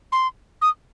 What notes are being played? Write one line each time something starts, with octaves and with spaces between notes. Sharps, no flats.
C6
D#6